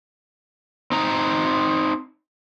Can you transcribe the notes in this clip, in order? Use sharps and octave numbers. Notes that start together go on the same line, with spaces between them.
C4 D#4 A#5